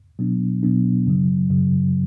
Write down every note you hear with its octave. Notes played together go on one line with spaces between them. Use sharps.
B2 F#3 B3 D4
B2 F#3 B3 D4
F#2 C#3 F#3
F#2 C#3 F#3